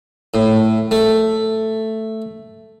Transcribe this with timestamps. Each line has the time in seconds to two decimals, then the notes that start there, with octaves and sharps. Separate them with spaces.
0.34 A2
0.91 A3